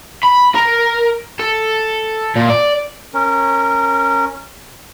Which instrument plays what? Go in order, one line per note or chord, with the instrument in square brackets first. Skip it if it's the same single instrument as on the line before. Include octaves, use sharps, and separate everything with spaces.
[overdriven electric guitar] B5
A#4
A4
A#2
D5
[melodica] C#4 A#4